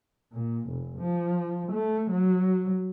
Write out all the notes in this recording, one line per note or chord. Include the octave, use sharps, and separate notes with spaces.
A#2
F1
F3
A3
F#3